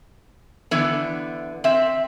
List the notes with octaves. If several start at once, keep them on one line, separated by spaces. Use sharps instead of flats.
D3 E3 B3
C4 E5